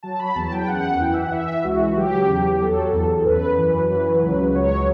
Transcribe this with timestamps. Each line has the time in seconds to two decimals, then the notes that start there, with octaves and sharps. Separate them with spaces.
0.03 F#3 A5
0.19 B5
0.35 E2 A5
0.52 G5
0.67 F#2 F#5
1.00 E3 G5
1.07 F#5
1.14 E5
1.22 F#5
1.32 E3 E5
1.64 C#2 F#4
1.97 F#3 G4
2.29 E2
2.61 F#3 A4
2.93 E2
3.25 F#2 B4
3.58 E3
3.90 F#3
4.22 C#2
4.50 B4
4.55 F#3 C#5